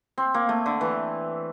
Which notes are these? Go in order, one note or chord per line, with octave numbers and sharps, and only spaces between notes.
C4
A#3
A3
D3
E3